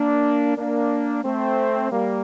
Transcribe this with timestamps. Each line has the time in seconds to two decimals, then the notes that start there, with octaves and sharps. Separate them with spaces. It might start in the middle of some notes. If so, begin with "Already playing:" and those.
Already playing: A#3 D4
0.57 A#3 D4
1.24 A3 C4
1.91 G3 A#3